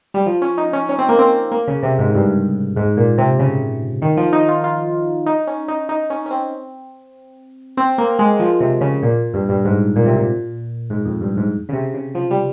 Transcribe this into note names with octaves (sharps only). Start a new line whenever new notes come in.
G3
F3
C#4
D#4
C#4
C#4
C4
A#3
C4
A#3
C#3
C3
G#2
G2
G#2
A#2
C3
C#3
D#3
F3
D#4
F4
F4
D#4
C#4
D#4
D#4
C#4
C#4
C4
C4
A#3
G#3
F3
C3
C#3
A#2
G2
G2
G#2
A#2
C3
A#2
G#2
F2
G2
G#2
C#3
C3
C#3
F3
G3